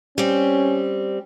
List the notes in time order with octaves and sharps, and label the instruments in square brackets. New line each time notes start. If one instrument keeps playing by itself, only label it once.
[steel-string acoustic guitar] G3 C4 [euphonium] C#4